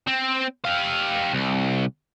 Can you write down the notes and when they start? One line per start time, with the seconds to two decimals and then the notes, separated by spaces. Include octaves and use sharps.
0.07 C4
0.65 G4 F5
1.33 C2